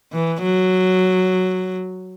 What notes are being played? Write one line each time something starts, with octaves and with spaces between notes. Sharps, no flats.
E3
F#3